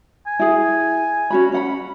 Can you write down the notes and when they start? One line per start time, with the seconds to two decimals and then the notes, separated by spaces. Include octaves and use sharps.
0.27 G#5
0.39 E4 G#4
1.30 C#4 F#4 B5
1.52 C#4 F#5 B5